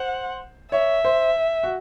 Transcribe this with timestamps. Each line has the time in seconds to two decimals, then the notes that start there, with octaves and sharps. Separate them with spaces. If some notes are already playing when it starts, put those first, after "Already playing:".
Already playing: C5 F#5
0.71 C#5 E5
1.05 C5
1.63 F#4